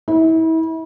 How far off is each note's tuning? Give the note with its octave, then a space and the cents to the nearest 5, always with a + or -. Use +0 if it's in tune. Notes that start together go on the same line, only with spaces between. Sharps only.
E4 -35